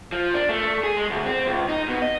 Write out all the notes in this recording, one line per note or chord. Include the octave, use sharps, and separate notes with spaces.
F3
D4
A3
G#4
G#3
D2
C4
C#2
D#4
B2
D#5